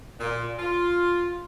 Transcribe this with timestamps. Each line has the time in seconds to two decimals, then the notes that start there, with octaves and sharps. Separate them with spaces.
0.20 A#2
0.59 F4